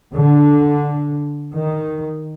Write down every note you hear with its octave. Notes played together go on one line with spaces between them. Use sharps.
D3
D#3